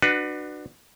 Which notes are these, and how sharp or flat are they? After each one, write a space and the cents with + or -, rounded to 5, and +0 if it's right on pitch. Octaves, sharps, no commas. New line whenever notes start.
D4 +30 F#4 +0 B4 +0